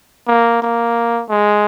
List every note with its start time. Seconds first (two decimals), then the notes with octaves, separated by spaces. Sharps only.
0.27 A#3
0.62 A#3
1.30 G#3